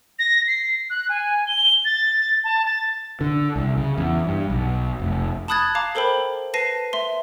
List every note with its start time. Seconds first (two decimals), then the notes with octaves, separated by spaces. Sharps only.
0.19 A#6
0.47 C7
0.90 F#6
1.09 G#5
1.47 G7
1.85 A6
2.44 A5
2.66 A6
3.21 D3
3.56 C2
3.78 C#3
3.98 E2
4.27 G2
4.50 B1
5.00 F1
5.48 A5 B5 D#6 F#6 G#6 A6
5.75 F5 A5 A#5 D6
5.95 A4 A#4 C5 G5 B5
6.54 B4 A5 A#6 C7 D#7
6.93 E5 C6